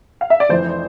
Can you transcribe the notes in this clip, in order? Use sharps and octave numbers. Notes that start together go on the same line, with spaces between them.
F5
E5
D5
F1 F2 E3 C5